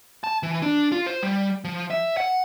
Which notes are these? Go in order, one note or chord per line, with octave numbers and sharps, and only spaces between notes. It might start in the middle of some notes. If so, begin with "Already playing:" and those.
A5
E3
D4
F4
C5
G3
F3
E5
F#5